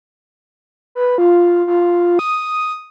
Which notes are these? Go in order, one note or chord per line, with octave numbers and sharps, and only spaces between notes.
B4
F4
F4
D#6